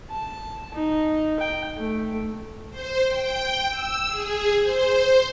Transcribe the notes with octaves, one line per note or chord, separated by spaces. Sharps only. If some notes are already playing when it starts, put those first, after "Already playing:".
A5
D#4
G5
A3
C5
G5
E6
G#4
C5